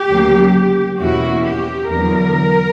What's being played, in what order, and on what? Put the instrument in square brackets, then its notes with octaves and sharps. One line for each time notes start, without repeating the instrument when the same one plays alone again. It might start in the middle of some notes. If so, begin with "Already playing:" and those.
Already playing: [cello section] G4
D2 C#3 F#3 A#3
E2 B2 A#3 C#4 E4 F#4
G4
E2 D3 F#3 B3 A#4